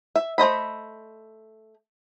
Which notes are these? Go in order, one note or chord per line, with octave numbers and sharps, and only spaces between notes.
E5
A3 C5 D#5 B5